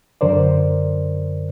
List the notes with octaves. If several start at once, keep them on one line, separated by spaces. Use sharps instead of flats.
F#2 D3 A#4 C5 D5